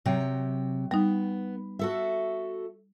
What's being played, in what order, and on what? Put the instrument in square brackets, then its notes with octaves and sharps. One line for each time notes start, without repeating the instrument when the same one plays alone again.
[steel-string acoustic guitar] C3 F#3 G5
[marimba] G3 D#4 [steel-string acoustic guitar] B3
[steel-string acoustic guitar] F#4 A4 E5